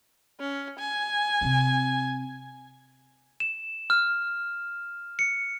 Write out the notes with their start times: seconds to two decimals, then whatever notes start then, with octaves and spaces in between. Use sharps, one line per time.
0.40 C#4
0.79 G#5
1.41 C3 C4
3.40 E7
3.90 F6
5.19 C#7